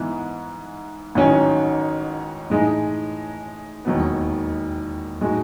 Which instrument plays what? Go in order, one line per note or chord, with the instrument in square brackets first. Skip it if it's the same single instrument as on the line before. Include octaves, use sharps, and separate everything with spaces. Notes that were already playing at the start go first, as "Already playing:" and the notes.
Already playing: [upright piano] G#2 E3 B3
A1 G#2 D#3 F#3 C#4
A2 E3 G#3 D#4
E1 D#2 D#3 F#3 B3
A2 G#3 D#4 F#4